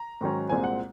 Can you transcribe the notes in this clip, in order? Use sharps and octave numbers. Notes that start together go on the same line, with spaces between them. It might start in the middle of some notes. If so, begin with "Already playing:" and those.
Already playing: A#5
G#2 D#3 F#3 C#4
C2 A#2 G#3 C4 G#5
F#5